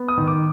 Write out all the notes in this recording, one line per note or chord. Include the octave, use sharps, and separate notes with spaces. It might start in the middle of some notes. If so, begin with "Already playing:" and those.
Already playing: B3
D#6
D#3
D6